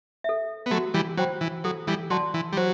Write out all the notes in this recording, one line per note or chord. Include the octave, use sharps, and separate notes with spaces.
A4 E5
B3
F#3 A3 F#4
E3 G3
F#3 C5 G5 B5
E3
F#3 A4
E3 G3
F#3 D5 A5 C6
E3
G3
F#3 C5